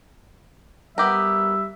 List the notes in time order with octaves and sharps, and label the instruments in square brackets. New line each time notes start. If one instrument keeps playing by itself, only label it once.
[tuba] G3 [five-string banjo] B3 G4 A#4 [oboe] E5